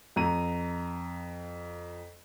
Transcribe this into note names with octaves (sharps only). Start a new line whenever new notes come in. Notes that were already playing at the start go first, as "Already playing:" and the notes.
F2 A#5 D#7